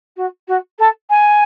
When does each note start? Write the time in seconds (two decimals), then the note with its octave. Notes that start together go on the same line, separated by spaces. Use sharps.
0.16 F#4
0.48 F#4
0.79 A4
1.10 G#5